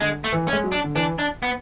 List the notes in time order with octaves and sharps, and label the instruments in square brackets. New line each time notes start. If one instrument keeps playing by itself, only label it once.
[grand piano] D3 [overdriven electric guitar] G#3
[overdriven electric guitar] A3
[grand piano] E3
[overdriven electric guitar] C#4
[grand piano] G#3
F#3
[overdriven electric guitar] D4
[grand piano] D3
[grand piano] E3 [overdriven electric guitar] D4
[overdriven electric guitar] D4
B3